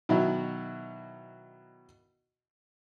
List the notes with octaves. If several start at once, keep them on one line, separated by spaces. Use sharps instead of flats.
B2 D#3 F#3 E4 F#4